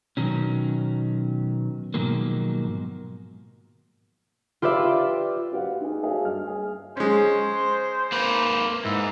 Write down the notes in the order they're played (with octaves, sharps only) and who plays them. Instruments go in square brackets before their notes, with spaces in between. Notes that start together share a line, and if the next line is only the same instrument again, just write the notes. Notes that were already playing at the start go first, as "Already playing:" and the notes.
[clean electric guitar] B2 D#3 F#3 C#4
G#2 B2 D#3 F3 F#3 A#3
[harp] F4 G4 B4 D5 E5
[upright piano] F#4 G4 F5 F#5
D#4 G#4
F#4 G#4 A4 C#5 E5 F5
G2 D#5 F6
G#4
[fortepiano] G#3 C#4 [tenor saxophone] C5
[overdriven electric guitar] A#3 B4
[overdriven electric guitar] G#2 [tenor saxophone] E4